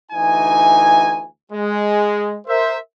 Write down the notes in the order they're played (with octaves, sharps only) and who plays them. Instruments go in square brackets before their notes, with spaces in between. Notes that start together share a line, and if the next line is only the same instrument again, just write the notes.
[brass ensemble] D2 E3 D#4 G#5
G#3
A#4 C5 E5